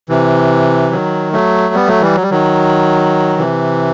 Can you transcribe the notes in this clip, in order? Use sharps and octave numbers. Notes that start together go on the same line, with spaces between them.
C3 E3
D#3 F#3
F#3 A3
G3 B3
F#3 A3
E3 G3
F#3
G3
D#3 F#3
C3 E3